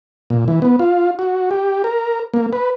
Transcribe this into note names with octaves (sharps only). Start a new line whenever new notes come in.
A#2
E3
B3
F4
F#4
G4
A#4
A#3
B4